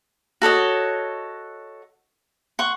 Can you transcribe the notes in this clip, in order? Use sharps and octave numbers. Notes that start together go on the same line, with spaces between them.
F#4 A4 C#5 D#5
F#5 C6 C#6